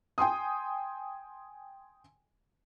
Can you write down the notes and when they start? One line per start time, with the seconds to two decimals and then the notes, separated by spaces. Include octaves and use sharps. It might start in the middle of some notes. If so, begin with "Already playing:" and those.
0.18 G5 G#5 C6 D#6